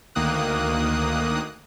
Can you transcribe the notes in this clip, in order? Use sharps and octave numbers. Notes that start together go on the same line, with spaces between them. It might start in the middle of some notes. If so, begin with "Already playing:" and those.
D2 D#3 A#3 D#6 F#6